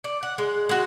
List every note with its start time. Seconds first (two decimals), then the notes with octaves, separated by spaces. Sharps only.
0.04 D5
0.23 F#5
0.38 G#3
0.69 G#3 F#4